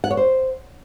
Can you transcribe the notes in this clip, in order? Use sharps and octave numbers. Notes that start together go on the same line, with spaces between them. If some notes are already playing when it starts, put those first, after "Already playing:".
F#5
C#5
C5